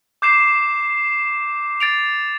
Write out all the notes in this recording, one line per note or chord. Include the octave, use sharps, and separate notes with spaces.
D6 G6 C7 E7
A6 D7 F7